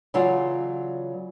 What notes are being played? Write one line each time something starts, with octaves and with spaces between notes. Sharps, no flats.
C#3 E3 F#3 F4 D5 F5